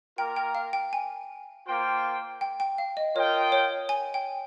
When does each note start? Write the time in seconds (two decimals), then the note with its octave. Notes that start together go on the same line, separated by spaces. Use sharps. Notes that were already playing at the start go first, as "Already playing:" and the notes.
0.18 A#3 F4 A#4 G5
0.36 G5
0.55 F5
0.73 G5
0.93 G#5
1.67 A#3 F4 C5 G5
2.41 G5
2.60 G5
2.78 F5
2.97 D#5
3.15 F4 A#4 C#5 D#5 G5
3.52 C#5
3.89 G#5
4.14 G5